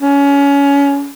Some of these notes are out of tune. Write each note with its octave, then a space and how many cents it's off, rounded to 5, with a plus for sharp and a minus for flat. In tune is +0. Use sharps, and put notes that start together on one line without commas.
C#4 +25